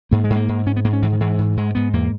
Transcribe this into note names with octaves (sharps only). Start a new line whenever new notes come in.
G#2 A#3
G#3
G#2
A#3
G#2
G#2 C#4
B3
G#2 A#3
C#4
G#2 E3
D#3
G#2 E3
G#2
G#2 G#3
G#2 B3
E2 A#3